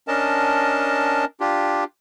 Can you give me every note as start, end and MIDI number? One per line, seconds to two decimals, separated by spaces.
0.08 1.25 61
0.08 1.25 62
0.08 1.25 70
0.08 1.25 75
0.08 1.25 81
1.40 1.84 62
1.40 1.84 65
1.40 1.84 67